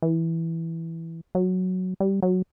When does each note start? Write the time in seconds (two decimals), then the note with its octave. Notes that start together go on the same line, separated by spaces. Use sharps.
0.02 E3
1.35 F#3
2.00 G3
2.23 F#3